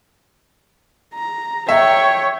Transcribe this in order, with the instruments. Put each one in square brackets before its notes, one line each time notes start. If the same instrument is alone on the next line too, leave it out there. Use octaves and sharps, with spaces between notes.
[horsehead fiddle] A#5
[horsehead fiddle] C#5 G5 [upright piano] E5